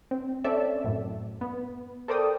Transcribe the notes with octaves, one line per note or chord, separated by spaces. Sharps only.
C4
C4 C#4 A4 D5 E5
F#2 A2
B3
A4 A#4 C5 D5 G5 D#6